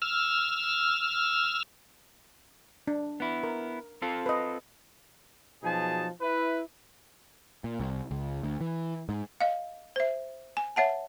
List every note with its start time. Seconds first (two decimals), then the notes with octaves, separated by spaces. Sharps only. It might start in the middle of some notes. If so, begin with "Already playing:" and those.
0.02 E6 F6
2.87 D4
3.20 B3 E4
3.43 A#4
4.02 C4 F4 A4
4.26 B4 D#5
5.63 B2 F3 F#3 D#4 G#4 A5
6.21 E4 B4
7.64 A#2
7.80 C2
8.11 C#2
8.43 D2
8.61 E3
9.09 G#2
9.41 D#5 F5
9.96 C5 E5
10.57 G#5
10.76 C#5 E5 F#5 A5